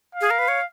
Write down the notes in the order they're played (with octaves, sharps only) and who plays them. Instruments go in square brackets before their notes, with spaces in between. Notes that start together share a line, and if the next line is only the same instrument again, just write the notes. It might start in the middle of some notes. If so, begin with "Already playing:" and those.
[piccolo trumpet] F5
[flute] G#4
A#4
B4
C#5